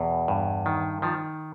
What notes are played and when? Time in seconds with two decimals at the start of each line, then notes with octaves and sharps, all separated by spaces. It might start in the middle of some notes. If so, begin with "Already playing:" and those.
Already playing: E2 B2
0.28 G2
0.66 D#3
1.02 D#3 F3